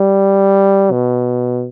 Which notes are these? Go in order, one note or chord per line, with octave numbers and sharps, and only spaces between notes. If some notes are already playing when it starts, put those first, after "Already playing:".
Already playing: G3
B2